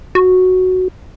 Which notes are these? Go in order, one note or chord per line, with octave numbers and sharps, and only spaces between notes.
F#4